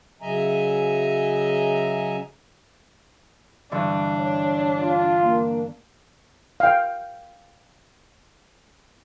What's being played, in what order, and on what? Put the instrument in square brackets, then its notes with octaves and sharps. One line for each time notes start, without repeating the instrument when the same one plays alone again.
[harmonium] C#3 F#3 D#5 E5 G#5 A#5
[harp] G2 D3 E3 [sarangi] D4
[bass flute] C#5
[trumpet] F4
[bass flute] A#3
[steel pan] F5 G5